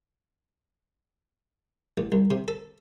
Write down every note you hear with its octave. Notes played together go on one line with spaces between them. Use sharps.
A1
C2
C3
A4